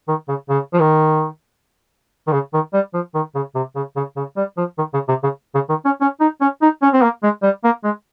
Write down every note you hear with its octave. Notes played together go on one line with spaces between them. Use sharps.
D#3
C#3
C#3
F3
D#3
D#3
C#3
D#3
G3
F3
D#3
C#3
C3
C#3
C#3
C#3
G3
F3
D#3
C#3
C3
C#3
C#3
D#3
C#4
C#4
D#4
C#4
D#4
C#4
C4
A#3
G#3
G3
A#3
G#3